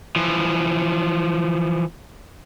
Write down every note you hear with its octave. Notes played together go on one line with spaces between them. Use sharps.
E3 F3